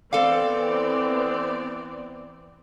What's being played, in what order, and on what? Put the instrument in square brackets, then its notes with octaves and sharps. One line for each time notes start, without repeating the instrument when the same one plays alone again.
[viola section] E3 B3 C4 [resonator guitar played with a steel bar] A4 F5 [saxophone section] D5